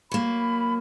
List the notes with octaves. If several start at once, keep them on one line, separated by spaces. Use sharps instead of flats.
F#3 A#3 B5